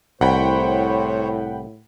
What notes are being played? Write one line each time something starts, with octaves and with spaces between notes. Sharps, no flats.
C2 A2 C5 C#5 F#5 G5 B5